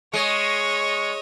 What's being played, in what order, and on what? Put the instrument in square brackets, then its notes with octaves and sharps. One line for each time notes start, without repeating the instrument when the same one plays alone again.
[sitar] G#3 [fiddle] C#5 D#5 [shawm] C#6